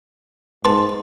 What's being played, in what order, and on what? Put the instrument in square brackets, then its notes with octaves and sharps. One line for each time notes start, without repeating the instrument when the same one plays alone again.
[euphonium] G#2 [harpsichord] B4 A5 [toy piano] C6